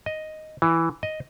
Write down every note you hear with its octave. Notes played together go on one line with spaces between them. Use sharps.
D#5
E3
D#5